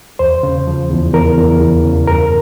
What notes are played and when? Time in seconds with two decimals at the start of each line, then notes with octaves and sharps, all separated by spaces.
0.19 E2 C5
0.43 C#3
0.67 F3
0.90 E2
1.14 E2 A#4
1.37 E2
1.61 E2
1.84 C#3
2.07 G2 A#4